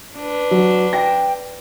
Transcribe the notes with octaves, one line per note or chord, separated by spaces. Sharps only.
D4 B4
F#3
G5 A#6